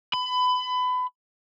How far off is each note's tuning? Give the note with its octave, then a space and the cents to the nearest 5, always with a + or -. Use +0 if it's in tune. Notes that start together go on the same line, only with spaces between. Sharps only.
B5 +25